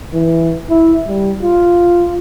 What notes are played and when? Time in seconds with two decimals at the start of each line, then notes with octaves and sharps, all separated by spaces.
0.13 E3
0.69 E4
1.08 G3
1.43 F4